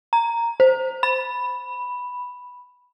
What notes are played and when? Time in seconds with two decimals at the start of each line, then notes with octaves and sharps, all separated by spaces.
0.13 A#5
0.60 C5
1.03 B5